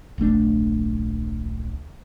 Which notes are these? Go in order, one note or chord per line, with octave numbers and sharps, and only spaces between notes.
D1 A#1 A3 D4